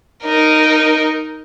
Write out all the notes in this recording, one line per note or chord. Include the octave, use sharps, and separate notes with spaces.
D#4 A#4